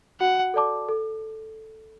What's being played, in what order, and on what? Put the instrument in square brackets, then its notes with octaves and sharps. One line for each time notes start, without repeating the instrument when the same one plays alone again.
[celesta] F#4 [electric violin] F#5
[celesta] A4 D5 A5 D6
A4